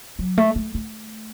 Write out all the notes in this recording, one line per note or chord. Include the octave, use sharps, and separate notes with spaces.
F#3
A3
A3
A3